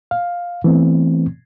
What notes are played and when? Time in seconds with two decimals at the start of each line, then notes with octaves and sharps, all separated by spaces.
0.11 F5
0.64 E3 A3 B3 C4